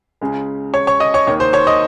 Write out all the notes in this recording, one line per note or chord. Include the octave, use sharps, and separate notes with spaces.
C#2 C#3 G#3
C#5 C#6
C#5 C#6
D#5 D#6
C#5 C#6
D#2 D#3 A#3 C#5 C#6
C5 C6
C#5 C#6
D#5 D#6